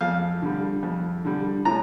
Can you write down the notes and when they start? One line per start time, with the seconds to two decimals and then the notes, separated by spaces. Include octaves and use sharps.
0.01 F2 F5
0.42 D3 G3
0.83 F2
1.25 D3 G3
1.65 A2 A#5